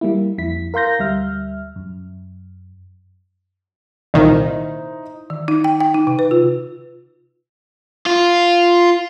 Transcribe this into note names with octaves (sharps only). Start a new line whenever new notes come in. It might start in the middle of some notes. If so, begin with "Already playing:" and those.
G3 A#3 E4
F2 E4 B6
A#4 F5 C6 G6 A#6
D2 G3 E5 F6
F#2
C2 A#2 D#3 D#4 E4 C5
D#3
D#4
G5
G5
D#4
C3
B4
F4
F4